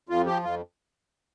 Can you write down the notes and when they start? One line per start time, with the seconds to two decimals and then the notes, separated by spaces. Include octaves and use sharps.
0.09 F2 F4
0.26 F3 G4
0.43 F2 F4